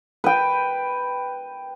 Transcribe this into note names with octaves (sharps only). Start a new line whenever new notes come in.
B4 G5